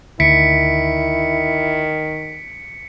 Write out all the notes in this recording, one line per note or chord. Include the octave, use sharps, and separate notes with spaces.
D2 D#3 E4 B6 C#7 D7